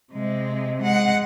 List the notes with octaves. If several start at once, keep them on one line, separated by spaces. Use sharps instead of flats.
C3 G#3
G#3 F#5